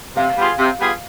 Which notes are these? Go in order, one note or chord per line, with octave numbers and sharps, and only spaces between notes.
C3 F5
G3 B3 F4 G#4
C3
G3 B3 F4 G#4